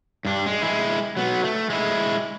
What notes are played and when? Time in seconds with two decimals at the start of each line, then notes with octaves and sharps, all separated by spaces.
0.25 G2 D4
0.46 G#3
0.62 G#3 E4
1.17 F#3 B3
1.44 A3
1.70 G#3 E4